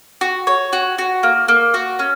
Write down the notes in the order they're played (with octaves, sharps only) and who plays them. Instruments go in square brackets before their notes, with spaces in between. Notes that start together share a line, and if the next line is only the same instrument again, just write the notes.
[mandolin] F#4
C#5
F#4
F#4
A#3
A#3
F#4
C#4